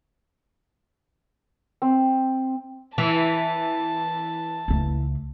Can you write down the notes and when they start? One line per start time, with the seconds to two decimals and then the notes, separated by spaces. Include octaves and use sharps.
1.82 C4
2.98 E3 A5
4.68 C#2 A3